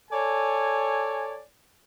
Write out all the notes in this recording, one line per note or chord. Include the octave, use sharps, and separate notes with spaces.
A4 C#5 D5 G#5